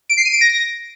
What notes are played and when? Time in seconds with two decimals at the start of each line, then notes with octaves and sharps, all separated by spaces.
0.09 D7
0.17 C7
0.25 D#7
0.33 D7
0.41 A#6